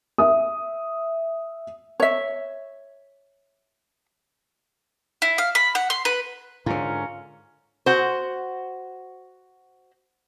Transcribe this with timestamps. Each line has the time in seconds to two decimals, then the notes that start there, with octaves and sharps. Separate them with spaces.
0.18 E5 D#6
2.00 C#5 E5
5.22 E4
5.38 F5
5.55 B5
5.75 F#5
5.90 C6
6.05 B4
6.66 G#2 D3 C#4 F4 A#4
7.86 F#4 C5